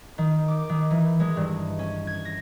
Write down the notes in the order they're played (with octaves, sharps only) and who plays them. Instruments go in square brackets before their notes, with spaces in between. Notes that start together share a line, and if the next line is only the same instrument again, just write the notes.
[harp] D#3
D6
D#3
E3
G#3
G2
C#4
G#6
A#6